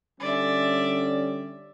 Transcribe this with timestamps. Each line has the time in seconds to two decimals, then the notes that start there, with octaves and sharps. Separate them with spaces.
0.20 D3 G3 C#4 D5 E5